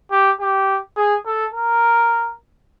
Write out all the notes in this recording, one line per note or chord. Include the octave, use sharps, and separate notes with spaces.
G4
G4
G#4
A4
A#4